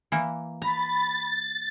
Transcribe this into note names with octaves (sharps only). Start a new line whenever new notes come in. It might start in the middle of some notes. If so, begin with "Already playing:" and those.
E3 A#3
A#5 B5 A6